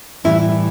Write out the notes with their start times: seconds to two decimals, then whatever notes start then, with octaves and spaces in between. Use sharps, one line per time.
0.24 A2 E3 G3 E4